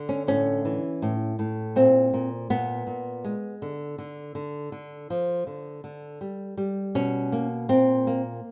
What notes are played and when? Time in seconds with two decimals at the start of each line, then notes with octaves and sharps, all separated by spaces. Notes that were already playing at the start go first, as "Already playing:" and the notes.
Already playing: D3
0.09 C#4
0.27 A2 C#4
0.65 E3
1.02 A2
1.39 A2
1.76 A#2 C4
2.13 A#2
2.50 A#2 B3
2.87 A#2
3.24 G#3
3.62 D3
3.98 D3
4.35 D3
4.72 D3
5.10 F3
5.47 D3
5.84 D3
6.21 G3
6.57 G3
6.95 B2 C#4
7.32 A#3
7.69 A#2 C4
8.07 A#3